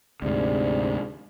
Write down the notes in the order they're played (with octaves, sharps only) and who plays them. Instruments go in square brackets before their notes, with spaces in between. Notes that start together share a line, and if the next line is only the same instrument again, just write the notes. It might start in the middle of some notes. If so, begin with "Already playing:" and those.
[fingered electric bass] D2 G#2 [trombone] C3 [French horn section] D4 G#4 D5